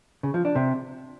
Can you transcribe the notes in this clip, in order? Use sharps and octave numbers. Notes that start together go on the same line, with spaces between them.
C#3
F3
D4
C3